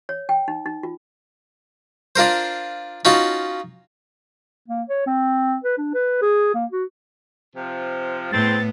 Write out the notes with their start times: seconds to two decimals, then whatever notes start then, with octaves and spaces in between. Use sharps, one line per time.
0.09 C#5
0.29 G5
0.48 D#4
0.66 D#4
0.83 F4
2.16 D4 F4 A#4 C5
3.05 C#4 D#4 F4 F#4 A5
4.68 A#3
4.89 C#5
5.07 C4
5.64 B4
5.78 D4
5.94 B4
6.22 G#4
6.55 A#3
6.71 F#4
7.56 C3 F3
8.32 E2 A2 B3 C4 A6